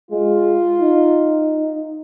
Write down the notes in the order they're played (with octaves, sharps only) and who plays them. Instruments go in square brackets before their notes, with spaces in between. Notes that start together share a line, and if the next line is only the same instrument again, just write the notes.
[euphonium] G#3 [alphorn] F4
[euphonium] D#4